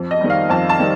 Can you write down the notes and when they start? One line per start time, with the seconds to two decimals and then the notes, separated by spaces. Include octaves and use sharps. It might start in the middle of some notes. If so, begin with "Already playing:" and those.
Already playing: F2
0.11 D#5
0.21 D#3 G3
0.30 F5
0.50 F2 A5
0.69 A5
0.79 D#3 G3